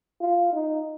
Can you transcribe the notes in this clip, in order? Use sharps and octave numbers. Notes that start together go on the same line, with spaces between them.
F4
D#4